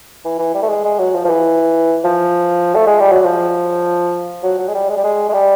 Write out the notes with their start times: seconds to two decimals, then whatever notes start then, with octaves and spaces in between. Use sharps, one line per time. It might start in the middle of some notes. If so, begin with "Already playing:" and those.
0.25 E3
0.39 E3
0.54 G3
0.62 A3
0.69 G#3
0.84 G#3
0.98 F#3
1.14 F3
1.25 F3
1.29 E3
2.04 F3
2.75 A3
2.86 G#3
3.00 G3
3.12 F#3
3.24 F3
4.43 F#3
4.59 F#3
4.68 G#3
4.74 G3
4.89 G#3
4.97 G3
5.04 G#3
5.29 G#3
5.33 G3